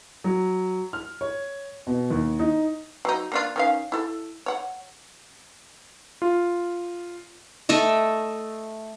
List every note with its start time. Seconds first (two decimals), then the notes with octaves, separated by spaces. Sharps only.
0.24 F#3
0.93 F6
1.21 C#5
1.87 B2
2.10 D#2
2.39 D#4
3.05 F#3 D#4
3.32 A#3 D4 F4
3.56 D#3 C#4 F5
3.92 E4 A4
4.46 C#5 F#5
6.22 F4
7.69 A3 A4 D#5 E5